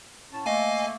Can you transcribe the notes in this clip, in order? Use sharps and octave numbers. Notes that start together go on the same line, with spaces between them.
A2 C#4 A5
A3 A#3 D#5 F5 G#5